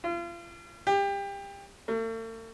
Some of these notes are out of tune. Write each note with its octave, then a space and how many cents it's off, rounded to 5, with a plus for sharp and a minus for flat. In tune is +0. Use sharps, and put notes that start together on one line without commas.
F4 -35
G4 +25
A3 +45